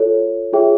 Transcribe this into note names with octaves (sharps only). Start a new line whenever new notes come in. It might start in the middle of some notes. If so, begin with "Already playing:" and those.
Already playing: F4 A4 C#5
F4 G#4 C#5 E5 G5